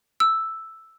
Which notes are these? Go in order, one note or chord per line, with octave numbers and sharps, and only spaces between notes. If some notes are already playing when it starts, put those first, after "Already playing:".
E6